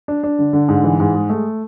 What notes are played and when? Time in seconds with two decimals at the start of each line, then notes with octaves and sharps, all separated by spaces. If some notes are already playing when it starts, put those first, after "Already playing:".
0.08 D4
0.23 D4
0.39 D3
0.53 D3
0.68 G#2
0.84 E3
1.00 G#2
1.14 G#3
1.30 A3